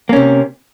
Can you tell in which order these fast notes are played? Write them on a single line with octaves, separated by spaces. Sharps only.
A#3 C#4 C3